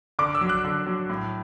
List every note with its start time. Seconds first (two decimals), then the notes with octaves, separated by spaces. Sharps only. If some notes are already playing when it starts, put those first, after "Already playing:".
0.19 D3 D6
0.35 E6
0.41 F#3
0.49 F#6
0.65 D3
0.86 F#3
1.10 A2